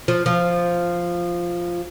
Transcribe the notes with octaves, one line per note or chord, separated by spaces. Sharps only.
F3
F3